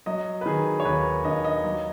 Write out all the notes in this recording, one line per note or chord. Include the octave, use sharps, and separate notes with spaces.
F#3 D#5
B4
D#3 G#4
C#5
D#2 B4
D#2 D#5
D#5
F#3